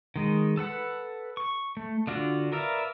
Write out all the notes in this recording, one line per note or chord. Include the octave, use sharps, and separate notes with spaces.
D#3 G#3
A4 B4 F#5
C#6
A3
D3 D4 F4 F#4
A#4 B4 D5 E5 F5